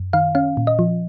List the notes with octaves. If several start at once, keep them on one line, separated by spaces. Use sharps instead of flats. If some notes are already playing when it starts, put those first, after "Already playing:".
Already playing: F#2
D#3 F5
C#4 F5
A#2
D#5
F3